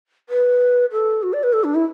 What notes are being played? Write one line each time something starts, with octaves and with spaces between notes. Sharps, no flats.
B4
A4
F#4
D5
B4
A4
D4
E4